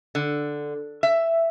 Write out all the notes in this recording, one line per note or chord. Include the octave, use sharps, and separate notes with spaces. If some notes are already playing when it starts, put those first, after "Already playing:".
D3
E5